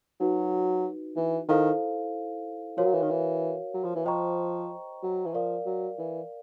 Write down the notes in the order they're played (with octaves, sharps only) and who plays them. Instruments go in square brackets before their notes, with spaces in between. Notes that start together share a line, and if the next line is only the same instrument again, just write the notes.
[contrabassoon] F#3 [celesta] D#4 F#4 B4
[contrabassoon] E3
[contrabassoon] D#3 [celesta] E4 A4 C5 F5
[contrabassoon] F3 [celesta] F#4 A#4 C#5 F5
[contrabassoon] F#3
E3
D#3
E3
F#3
F3
E3
[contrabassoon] F3 [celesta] C5 D#5 G5 A#5 C#6
[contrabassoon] F#3
E3
[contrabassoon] F3 [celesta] A#4 D5 F5
[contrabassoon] F#3
E3